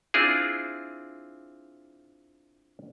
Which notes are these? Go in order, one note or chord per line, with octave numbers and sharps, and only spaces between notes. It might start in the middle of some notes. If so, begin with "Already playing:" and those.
C4 D4 E4 F4 G#4